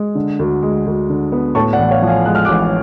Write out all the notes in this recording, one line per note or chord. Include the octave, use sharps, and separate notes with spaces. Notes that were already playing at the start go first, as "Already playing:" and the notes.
Already playing: G#3
D3
D2
G#3
D2
D3
B3
A2 A5 C#6
D5 F#5
A1
C#5 F5
F3
F5 G#5
G#3 F#6
F6
A1 D6 F#6